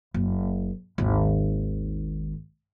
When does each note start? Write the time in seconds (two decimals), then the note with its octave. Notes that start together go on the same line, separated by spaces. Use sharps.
0.14 F#1
0.98 G#1 D#2